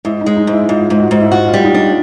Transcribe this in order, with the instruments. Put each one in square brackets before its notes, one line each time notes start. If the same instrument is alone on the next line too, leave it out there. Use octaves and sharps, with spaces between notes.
[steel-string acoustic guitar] G#2 [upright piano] E4
[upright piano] D#4
[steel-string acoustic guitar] G#3
[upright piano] D#4
[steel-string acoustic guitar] G#2
[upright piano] E4
[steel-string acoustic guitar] G#2 [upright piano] F4
[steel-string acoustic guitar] G#2
[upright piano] F#4
[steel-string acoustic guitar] G#2
[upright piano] E4
[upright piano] F4 [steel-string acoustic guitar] F#4
[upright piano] F4
[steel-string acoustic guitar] G3
[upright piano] D#4
[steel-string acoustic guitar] D4 [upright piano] F4